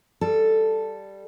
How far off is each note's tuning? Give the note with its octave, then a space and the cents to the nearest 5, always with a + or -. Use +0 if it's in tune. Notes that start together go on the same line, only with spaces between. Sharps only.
G3 +0 A4 +0